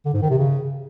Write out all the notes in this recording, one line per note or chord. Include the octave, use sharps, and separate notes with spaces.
D3
G#2
D#3
C3
C#3